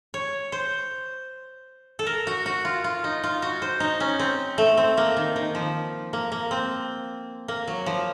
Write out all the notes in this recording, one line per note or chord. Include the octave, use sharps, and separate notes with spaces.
C#5
C5
A4
A#4
F#4
F#4
F4
F4
D#4
F4
F#4
C5
D#4
C#4
C4
A3
C4
A#3
D#3
D#3
F3
A#3
A#3
C4
A#3
F#3
F3